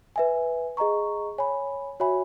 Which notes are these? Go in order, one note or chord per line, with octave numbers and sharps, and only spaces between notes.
B4 E5 G#5
G#4 D#5 A#5 C#6
C#5 G#5 B5
F#4 C#5 E5 G#5 B5